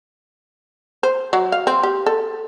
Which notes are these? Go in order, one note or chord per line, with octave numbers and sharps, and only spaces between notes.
C5
F#3
F5
C4
G4
A4